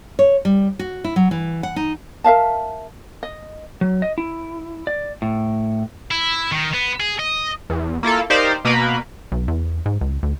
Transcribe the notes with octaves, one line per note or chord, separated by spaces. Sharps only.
C#5
G3
F#4
E4
F#3
E3
F#5
D#4
A#4 E5 F5 A5
D#5
F#3
D#5
E4
D5
A2
E4
D#3
B3
G#4
D#5
E2
A#3 E4 F4 A4
D#4 G4 A#4 C5 D5 F5
B2 A#3 A#4 B4 B5
B1
E2
G#2
C#2
D2